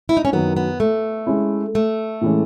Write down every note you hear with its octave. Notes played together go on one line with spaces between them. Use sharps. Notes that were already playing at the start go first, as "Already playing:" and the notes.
E4
D#4
C#4
F#2 D#3 F#3 B3
B3
A3
G#3 C#4 E4
A3
A2 E3 G#3 C#4